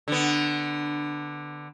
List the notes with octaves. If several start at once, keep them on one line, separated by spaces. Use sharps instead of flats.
D3 B3